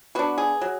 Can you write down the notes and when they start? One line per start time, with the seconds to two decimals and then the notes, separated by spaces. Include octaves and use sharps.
0.15 B3 D4 F#4
0.38 G#4
0.61 F#3